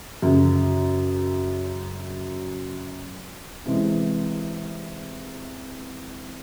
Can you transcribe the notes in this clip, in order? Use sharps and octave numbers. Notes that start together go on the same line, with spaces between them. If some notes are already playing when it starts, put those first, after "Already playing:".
F#2 C#3 F#3
C3 E3 G#3